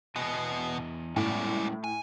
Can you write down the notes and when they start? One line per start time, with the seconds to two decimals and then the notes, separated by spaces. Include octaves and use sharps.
0.16 E2 B2 B3 D#5 G#5
1.16 A2 G3 G#3 C#4 D5
1.84 G#5